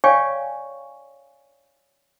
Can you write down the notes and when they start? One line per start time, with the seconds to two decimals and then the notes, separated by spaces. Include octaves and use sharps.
0.04 C#5 D5 F5 G5 G#5 C#6